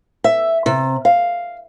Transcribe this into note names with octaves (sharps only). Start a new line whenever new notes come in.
E5
C3
F5